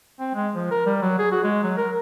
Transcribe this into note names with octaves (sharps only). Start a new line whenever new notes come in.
C4
G#3
F3
A#4
G3
F#3
G#4
F#4
G#3
F#3
A#4